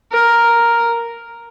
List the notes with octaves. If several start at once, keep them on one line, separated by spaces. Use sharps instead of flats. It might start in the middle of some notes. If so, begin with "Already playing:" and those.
A#4